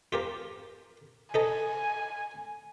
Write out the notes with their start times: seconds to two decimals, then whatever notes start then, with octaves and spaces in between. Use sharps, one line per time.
0.12 F4 G4 A#4
1.34 D#4 A4 D#5 G#5